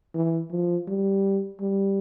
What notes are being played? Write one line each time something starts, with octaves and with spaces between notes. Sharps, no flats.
E3
F3
G3
G3